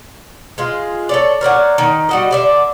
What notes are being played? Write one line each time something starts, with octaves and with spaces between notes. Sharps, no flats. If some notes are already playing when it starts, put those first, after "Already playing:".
G#3 F4
A4 C#5 D5
A#4 C#5 D5 F#5
D#3
G3 F#4 D#5
D3 D5 E5